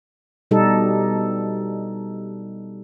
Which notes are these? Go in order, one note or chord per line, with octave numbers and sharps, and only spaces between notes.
B2 G3 D#4 A4